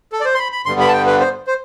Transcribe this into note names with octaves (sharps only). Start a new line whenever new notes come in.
A4
D5
C5
C6
B5
B5
G2 D3 G3 B3 C6
B5
A5
G5
B4
C5
C5